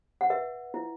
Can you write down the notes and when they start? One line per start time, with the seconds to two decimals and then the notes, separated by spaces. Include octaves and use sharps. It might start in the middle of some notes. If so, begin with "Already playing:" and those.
0.21 F#5
0.30 B4 E5
0.74 E4